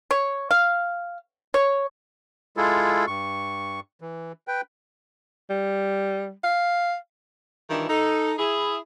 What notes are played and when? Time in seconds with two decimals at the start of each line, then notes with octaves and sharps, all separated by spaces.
0.11 C#5
0.51 F5
1.54 C#5
2.57 G#3 E4 F4 G#4 A4
3.07 G2 C#6
4.01 E3
4.48 B4 G5
5.50 G3
6.44 F5
7.69 G2 D#3 E3 D4 E4 F4
7.89 D#4 A4
8.38 E4 G#4